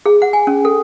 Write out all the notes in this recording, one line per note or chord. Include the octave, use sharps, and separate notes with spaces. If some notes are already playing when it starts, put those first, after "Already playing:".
G#4
F#5
G#5
C#4
A4